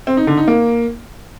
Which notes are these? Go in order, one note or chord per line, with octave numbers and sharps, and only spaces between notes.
C4
D#4
D3
D#4
A#3